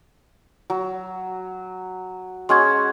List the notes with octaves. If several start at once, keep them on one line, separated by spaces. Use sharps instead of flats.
F#3
G#3 C#4 F#4 C6 C#6 G#6